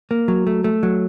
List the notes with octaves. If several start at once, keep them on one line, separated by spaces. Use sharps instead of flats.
A#3
F#3
A3
A3
F#3